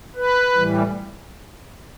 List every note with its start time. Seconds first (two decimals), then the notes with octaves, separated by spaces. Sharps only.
0.16 B4
0.54 A2 E3 G3